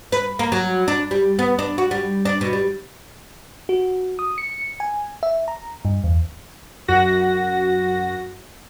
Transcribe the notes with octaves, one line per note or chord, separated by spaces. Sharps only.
B4
A#3
F#3
D4
G3
B3
D4
F#4
G3
D4
B2
G3
F#4
D#6
C#7
G#5
E5
A#5
G2
E2
F#2 F#4 A#6